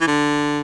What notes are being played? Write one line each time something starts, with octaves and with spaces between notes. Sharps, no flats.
E3
D3